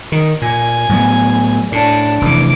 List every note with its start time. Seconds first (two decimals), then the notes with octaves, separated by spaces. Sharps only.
0.12 D#3
0.42 A#2 G#5
0.89 A2 F#3 B3
1.72 A2 D4 A5
2.21 F1 B2 E3 D6